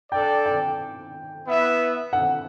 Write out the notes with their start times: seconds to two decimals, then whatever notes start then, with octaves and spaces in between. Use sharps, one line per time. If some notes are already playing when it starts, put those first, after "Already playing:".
0.12 D4 A4 D5 G5
0.46 G5
1.45 B3 E4 B4 E5
2.13 F#5